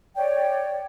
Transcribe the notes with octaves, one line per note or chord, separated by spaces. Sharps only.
C#5 D5 G5